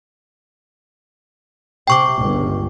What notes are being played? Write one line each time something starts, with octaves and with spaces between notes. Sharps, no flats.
C3 G5 C#6 D6
G1 C#2 G2